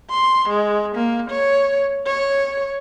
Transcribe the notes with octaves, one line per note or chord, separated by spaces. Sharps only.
C6
G#3
A#3
C#5
C#5